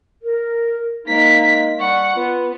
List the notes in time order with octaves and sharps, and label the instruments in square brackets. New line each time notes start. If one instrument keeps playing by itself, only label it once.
[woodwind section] A#4
[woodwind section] G#3 D#4 [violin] A#3 B6
[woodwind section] G3 C#6 [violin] F#5
[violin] B3 [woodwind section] F4 B4